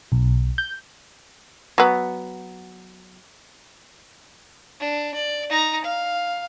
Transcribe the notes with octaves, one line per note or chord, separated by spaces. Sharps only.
B1
G6
F#3 B3
D4
D5
D#4 A#5
F5